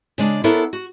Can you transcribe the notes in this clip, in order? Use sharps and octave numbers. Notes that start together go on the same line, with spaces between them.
C#3 G#3 D4
B3 D4 E4 A4 A#4 C#5
F#4